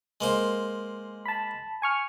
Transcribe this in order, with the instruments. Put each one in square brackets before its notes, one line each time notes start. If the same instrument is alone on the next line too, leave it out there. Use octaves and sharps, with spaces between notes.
[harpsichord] G#3 A#3 C5
[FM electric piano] A5 B5
G#5 C#6 F6